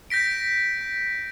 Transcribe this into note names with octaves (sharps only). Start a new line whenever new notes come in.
G6 A#6 B6 D7